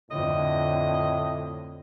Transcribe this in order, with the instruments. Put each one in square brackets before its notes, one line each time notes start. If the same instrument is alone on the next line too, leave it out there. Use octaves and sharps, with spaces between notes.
[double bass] F2 D3 [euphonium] A2 [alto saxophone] D#5